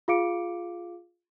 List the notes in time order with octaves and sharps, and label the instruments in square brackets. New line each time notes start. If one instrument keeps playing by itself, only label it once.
[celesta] F4 G#4 F5 D6 C#7 D7